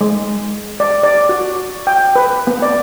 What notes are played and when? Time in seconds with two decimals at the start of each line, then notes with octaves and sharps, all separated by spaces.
0.01 G#3
0.80 D5
1.03 D5
1.29 F#4
1.87 G5
2.16 B4
2.47 B3
2.62 D5